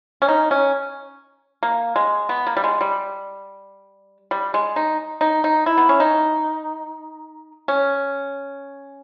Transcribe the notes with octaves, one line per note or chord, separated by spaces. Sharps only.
C#4
D#4
C#4
A#3
G#3
B3
A#3
G3
G#3
G3
G3
G#3
D#4
D#4
D#4
E4
B3
C#4
D#4
C#4